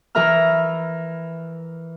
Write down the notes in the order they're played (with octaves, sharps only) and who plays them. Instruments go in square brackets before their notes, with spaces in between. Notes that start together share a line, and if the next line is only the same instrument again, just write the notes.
[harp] E3 A#4 E5 A#5 F6